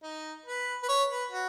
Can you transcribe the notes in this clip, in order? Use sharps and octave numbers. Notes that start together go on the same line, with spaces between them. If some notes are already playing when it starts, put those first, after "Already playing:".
D#4
B4
B4
C#5
B4
F#4